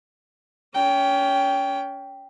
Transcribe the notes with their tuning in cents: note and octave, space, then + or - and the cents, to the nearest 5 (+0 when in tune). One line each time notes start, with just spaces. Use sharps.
C#4 +25 G5 +0